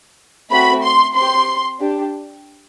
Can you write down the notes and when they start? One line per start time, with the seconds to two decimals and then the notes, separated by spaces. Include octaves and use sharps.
0.51 A3 C4 F#4 B5
0.83 C6
1.15 C4 G4 C6
1.80 D4 G4